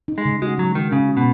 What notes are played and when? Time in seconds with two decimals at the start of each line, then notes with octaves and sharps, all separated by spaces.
0.08 D#4
0.18 G#3
0.25 C#3
0.42 G#3 F#4
0.58 F#3 G#3
0.75 D#3 G#3
0.92 C#3 C#4
1.08 F#4
1.17 B2